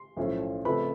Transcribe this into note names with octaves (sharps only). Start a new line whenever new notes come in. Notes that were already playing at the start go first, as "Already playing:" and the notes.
Already playing: C6
B1 A2 F3 A3 C#4
F2 C#3 F3 A3 C4 B4 B5